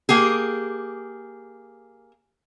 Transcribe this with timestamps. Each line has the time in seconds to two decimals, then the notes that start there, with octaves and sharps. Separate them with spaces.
0.09 A#3 G4 G#4